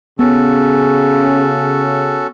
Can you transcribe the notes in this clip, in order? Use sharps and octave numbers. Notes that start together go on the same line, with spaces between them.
C#3 B3 C#4 F#4 A4